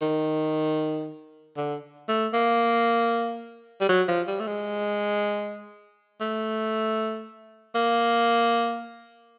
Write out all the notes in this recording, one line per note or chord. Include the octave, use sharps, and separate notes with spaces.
D#3
D3
A3
A#3
G3
F#3
F3
G3
A3
G#3
A3
A#3